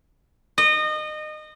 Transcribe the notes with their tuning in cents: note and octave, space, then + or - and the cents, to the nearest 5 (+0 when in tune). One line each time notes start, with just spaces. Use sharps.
D#5 -25